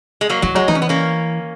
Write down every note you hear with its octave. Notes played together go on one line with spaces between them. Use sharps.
G#3
F#3 A#3
E3 F#3
F#3 G#3
E3 D#4
C#4
B3
A#3 C#4